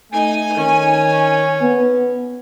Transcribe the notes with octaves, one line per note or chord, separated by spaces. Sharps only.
A3 D#4 G#5
D#3 C#4
B3